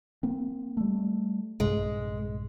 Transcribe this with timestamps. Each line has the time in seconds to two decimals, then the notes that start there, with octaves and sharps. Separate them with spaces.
0.23 A#3 C4
0.77 G3 A3
1.60 A#1 G2 C3 G#3